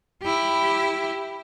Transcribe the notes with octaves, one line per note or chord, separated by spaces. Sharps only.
E4 G4